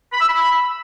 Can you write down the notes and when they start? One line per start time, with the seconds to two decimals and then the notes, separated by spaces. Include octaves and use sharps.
0.12 B5
0.21 E6
0.29 B5